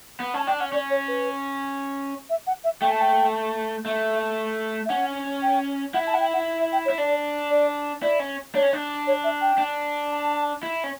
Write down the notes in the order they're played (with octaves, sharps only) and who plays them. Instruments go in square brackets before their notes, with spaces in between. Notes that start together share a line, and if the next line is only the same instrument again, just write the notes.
[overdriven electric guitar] B3
[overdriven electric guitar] C#4 [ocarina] A5
[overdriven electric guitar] D4 [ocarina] G5
[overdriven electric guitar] C#4 [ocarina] F#5
[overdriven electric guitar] C#4 [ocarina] D5
[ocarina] C#5
B4
E5
F#5
E5
[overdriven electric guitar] A3 [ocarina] G5
[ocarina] A5
G5
[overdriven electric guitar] A3 [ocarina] E5
[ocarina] E5
[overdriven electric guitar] C#4 [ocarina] F#5
[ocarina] G5
[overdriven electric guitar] E4 [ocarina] F#5
[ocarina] A5
F#5
G5
F#5
E5
G5
C#5
[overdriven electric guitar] E4
[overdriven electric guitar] D4 [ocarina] D5
[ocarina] D5
[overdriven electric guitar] E4 [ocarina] D5
[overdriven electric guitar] C#4
[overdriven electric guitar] D4 [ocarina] C#5
[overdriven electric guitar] C#4
D4
[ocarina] C#5
E5
G5
[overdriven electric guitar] D4
[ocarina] A5
[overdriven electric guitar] E4
C#4